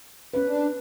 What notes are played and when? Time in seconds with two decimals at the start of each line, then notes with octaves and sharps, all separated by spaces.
0.34 C#4 B4
0.45 D4